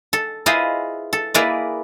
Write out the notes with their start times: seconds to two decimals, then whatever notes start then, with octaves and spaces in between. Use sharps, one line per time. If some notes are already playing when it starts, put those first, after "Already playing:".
0.13 A4
0.46 E4 F4 G#4 B4 C5 D#5
1.13 A4
1.34 A#3 E4 G#4 A#4 B4 D5